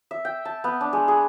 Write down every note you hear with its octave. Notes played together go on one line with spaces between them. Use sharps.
E5
G5
A5
B3
D4
G#3
G#4